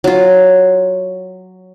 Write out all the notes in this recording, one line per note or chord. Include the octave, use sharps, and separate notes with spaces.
F#3 F4